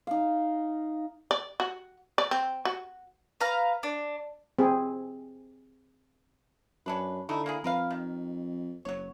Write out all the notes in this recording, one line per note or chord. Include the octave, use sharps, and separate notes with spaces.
D#4 F5
D5
F#4
D5
C4
F#4
B4 F5 A#5
D4
C4 G#4
F#2 C#4 D4 B4
D3 A3 D#4 E4
A#3 E4 G#4
F2 A#4 B4 F5
D#3
F#1 F#3 C#5